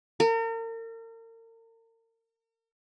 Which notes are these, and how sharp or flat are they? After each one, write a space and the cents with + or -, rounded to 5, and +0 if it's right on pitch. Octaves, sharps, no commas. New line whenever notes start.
A#4 -40